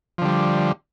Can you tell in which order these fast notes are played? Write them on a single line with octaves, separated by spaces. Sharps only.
F3 D3 G3